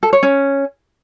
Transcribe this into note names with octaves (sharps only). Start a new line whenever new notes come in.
A4
C#5
C#4